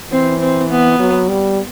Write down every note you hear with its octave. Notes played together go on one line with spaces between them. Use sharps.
E3 C4
C4
B3
F#3
G3